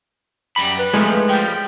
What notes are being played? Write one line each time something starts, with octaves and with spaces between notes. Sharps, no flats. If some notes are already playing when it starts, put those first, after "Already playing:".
F#2 G3 B5
B4
F2 D#3 F3 G#3 A3
F3 G3 G5